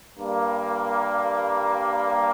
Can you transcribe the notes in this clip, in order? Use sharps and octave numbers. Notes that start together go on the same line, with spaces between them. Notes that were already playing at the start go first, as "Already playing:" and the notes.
G2 G3 A#3